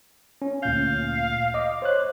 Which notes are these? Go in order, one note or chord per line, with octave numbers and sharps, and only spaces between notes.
C#4
D2 A#2 F5 G6
D#5 D6
C5 C#5 F#6